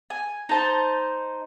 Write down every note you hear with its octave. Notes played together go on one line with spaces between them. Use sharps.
G#5
D#4 C5 A5